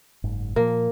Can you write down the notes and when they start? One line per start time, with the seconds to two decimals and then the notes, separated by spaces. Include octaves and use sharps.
0.24 F#1 G#2
0.56 A#2 F3 A#3